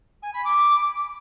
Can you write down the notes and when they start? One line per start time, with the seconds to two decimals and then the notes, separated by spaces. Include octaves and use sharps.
0.23 G#5
0.34 B5
0.45 D6